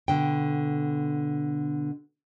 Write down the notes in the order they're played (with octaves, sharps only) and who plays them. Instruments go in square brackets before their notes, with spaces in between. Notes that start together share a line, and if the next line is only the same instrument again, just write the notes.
[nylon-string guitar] B2 D3 G5